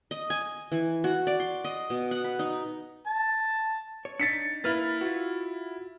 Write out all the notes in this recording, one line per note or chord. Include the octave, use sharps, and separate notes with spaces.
D#5
G#5
E3
F#4
D5
C6
D#5
B2
F#5
B5
D#4
A5
C#5
D4 D#4 A6 B6 C#7
A#3 E4 B4 F6 A6
F4 F#4